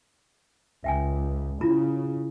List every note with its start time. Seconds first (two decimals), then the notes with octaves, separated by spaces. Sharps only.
0.84 C#2 E5 G5 G#5
1.61 C#3 E4 F4 A#5